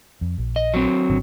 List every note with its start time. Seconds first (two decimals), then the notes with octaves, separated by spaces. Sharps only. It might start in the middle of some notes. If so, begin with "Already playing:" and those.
0.21 F2
0.38 A#1
0.56 D#5
0.74 F#3 C4
1.09 G#1 D3